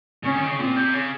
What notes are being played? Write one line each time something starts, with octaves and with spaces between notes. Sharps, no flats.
C#3 C#4
D#3
C#3
A#2 C4
C3
C#3